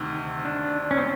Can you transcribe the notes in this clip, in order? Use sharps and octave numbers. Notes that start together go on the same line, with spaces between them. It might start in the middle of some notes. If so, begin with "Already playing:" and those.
Already playing: D2 C3 D#3
D4
C#4
C4